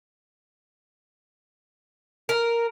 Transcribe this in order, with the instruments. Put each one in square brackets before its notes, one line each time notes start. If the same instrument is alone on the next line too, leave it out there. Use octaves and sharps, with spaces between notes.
[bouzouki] A#4